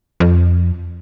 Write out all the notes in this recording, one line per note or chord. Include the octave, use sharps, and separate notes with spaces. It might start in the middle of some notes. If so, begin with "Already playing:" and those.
F2